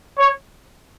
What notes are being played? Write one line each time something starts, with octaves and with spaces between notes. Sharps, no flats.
C#5